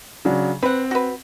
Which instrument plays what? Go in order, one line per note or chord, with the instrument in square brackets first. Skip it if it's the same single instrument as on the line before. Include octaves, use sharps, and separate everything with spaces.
[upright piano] C#3 F#3 D4
[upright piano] C4 [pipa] B4 F#5
[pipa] F#4 B4